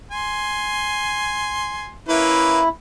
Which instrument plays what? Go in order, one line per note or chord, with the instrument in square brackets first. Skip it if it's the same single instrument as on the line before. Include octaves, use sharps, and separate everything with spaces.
[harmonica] G#5 C6
[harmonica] A#3 C#4 B4 [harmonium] E4